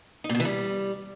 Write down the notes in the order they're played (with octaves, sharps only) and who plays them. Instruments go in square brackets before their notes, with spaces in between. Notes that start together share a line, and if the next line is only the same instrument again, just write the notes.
[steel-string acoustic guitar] D#4
A#2
B2
E3
G3